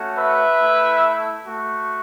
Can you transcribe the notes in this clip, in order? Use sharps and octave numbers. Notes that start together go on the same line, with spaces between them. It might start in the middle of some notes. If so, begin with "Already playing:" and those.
Already playing: A3 C#4 F#4
B4 E5
A3 E4
A3 F#4